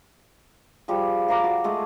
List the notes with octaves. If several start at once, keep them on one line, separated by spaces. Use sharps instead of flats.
F3 G3 G4 G#4
F5 A#5 D6
F#4
G#3 A3 G#4